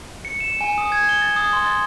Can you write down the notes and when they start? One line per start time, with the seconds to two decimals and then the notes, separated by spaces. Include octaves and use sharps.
0.25 C#7
0.40 E7
0.61 G#5
0.78 D#6
0.92 G#6
1.09 G7
1.22 A6
1.36 D#6
1.53 C6
1.67 A6